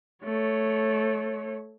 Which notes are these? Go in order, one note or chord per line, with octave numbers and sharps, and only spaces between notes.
A3 C#5